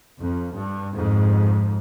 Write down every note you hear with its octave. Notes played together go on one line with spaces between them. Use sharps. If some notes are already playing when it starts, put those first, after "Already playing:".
F2
G2
F2 G#2